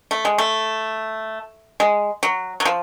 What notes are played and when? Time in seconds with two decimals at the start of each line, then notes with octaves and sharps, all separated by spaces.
0.11 A3
0.25 G#3
0.38 A3
1.80 G#3
2.23 F#3
2.60 F#3
2.65 F3